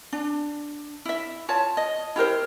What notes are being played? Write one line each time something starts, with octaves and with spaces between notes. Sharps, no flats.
D4
E4 E5
F4 C#5 A5
D#5
E4 G4 A#4 C5